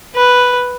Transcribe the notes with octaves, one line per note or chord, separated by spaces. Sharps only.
B4